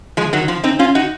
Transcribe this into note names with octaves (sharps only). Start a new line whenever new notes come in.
F3 G#3
D#3 F#3
F3
C4 D#4
C#4 F4
D#4 F#4